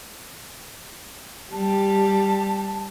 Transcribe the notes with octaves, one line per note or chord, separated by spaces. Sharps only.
G3 G4 A5